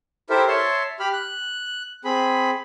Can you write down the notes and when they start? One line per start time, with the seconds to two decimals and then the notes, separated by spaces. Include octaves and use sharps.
0.30 E4 G4 A4 A#4 C5 E5
0.48 C#5 E5 A5 C6
1.00 G4 B5 F6
1.13 F#6
2.05 C4 G#4 B5